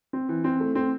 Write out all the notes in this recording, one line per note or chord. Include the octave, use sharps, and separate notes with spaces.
C4
E3
C4
A3
C4